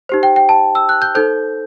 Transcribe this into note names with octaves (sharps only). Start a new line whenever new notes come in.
D#4 G4 C5
G5
G5
A5
E6
F#6
G6
D#4 A4 C5 G6